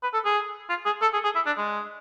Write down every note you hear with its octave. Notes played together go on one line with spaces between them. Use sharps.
B4
A4
G#4
F4
G#4
A4
G#4
G#4
E4
D4
G#3